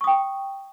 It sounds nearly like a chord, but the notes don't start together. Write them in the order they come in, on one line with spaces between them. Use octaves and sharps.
C#6 D#6 G5